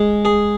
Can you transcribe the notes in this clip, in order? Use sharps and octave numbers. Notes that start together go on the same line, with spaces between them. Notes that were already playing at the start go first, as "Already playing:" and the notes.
Already playing: G#3
G#4